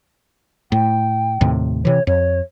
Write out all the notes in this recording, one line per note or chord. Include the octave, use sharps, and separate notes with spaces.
A2 G5
D#2 A2 C3
C3 E3 C#5
F2 C#5